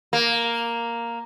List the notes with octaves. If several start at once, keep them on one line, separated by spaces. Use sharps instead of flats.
A#3